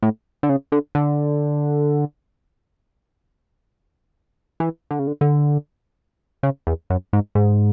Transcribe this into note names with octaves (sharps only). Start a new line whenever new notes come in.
A2
D3
C#3
D3
D3
E3
D3
C#3
D3
D3
C#3
E2
F#2
G#2
G#2